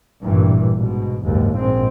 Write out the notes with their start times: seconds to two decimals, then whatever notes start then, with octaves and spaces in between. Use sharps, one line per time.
0.23 A1 G2 A#2 E3
0.78 G#2 B2
1.25 F#1 D#2 G#2
1.57 A#1 G#2 G#3 C4